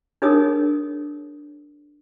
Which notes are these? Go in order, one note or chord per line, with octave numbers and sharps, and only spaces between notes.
D4 D#4 G#4 A#4 C#5 D#6